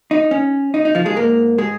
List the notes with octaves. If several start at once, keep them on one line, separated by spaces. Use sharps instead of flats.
D#4
C#4
D#4
D#4
F3 F4
G#3 G#4
G#2 G#3 A#3 A#4
G#3 G#4